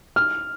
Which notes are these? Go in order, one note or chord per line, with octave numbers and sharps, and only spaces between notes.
F6